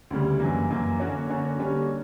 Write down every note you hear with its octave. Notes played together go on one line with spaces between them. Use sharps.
D2 C#3 G3
F#2 E3 A#3
F#2 E3 A#3
D3 A#3 C#4 F#4 C#5
D3 A#3 C#4 F#4 C#5
D3 G3 A#3 C#4